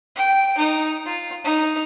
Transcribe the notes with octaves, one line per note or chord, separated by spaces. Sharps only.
G5
D#4
F4
D#4